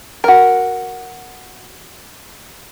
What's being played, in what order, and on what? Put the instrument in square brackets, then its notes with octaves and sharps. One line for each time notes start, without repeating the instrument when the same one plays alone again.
[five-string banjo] F#4 A#4